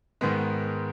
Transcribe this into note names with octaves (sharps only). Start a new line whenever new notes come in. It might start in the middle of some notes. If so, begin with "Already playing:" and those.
G#2 D#3 G#3 B3